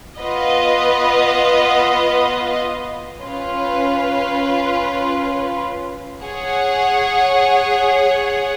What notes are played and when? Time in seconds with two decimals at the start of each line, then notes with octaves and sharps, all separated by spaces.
0.21 B3 F4 B4 D#5
3.21 C#4 F4 B4
6.23 G#4 C#5 F#5